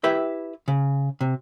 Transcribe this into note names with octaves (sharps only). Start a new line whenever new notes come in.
E4 G4 B4 E5 G5
C#3
C3